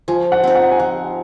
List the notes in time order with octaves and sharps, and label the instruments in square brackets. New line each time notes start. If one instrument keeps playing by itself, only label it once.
[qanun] F3 [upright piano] G#5
[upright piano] F#5
[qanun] C4 D#4
[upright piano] F#5
G#5
[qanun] F3 [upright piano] F#5